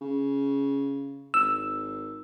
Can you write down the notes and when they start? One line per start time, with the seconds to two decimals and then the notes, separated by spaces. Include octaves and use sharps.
0.01 C#3
1.34 G#1 E6